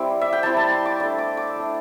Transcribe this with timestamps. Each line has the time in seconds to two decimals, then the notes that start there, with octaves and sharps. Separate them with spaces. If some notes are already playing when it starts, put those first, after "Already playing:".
Already playing: G3 C4 E4 G5 D6
0.21 E5
0.33 G5
0.43 G3 C4 E4 A5
0.57 A5
0.71 C6
0.85 D6
1.00 A3 D4 D6
1.18 D6
1.37 D6
1.56 A3 D4